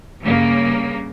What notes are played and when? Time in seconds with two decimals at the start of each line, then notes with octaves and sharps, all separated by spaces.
0.23 G2 C#3 A#3